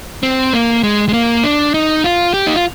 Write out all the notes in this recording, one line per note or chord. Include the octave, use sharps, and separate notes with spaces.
C4
A#3
G#3
G#3
A#3
D4
D#4
F4
G4
D#4
F4